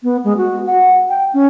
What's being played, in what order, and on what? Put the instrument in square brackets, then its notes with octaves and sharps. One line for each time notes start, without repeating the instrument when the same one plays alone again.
[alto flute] B3
G#3
F#4
F#5
G5
C#4